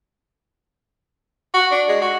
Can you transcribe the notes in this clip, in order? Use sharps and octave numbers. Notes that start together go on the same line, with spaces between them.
F#4
D4
G#3
F#4